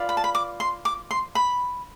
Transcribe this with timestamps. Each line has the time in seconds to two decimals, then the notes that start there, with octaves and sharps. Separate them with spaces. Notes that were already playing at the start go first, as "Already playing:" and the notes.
Already playing: F4 B4 D5
0.09 B5
0.17 A5
0.24 B5
0.35 D6
0.60 C6
0.85 D6
1.11 C6
1.35 B5